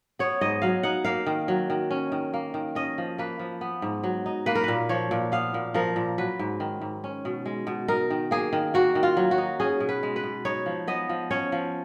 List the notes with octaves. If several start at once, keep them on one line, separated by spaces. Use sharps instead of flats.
B3 C#5
G#2 D#5
F#3 F5
D#4 F#5
A#3 F5
D#3
F#3
D#3
C#4
D#3
A#3
D#3
C#4 D#5
F3
A#3 B4
F3
B3
G#2
F#3
D#4
A#3 B4
A#4
A#2 B4
F3 C#5
A#2
B3 F5
A#2
F3 A#4
A#2
F#3 B4
G#2
D#3
G#2
C#4
B2
G#3
B2
D#4 A#4
D#3
A#3 G#4
D#3
A#3 F#4
D#3
F4
F#3
F#4
D#4
C#4 G#4
B2
B4
G#3
B4
B2
D#4 C#5
F3
B3 D#5
F3
C#4 C#5
F3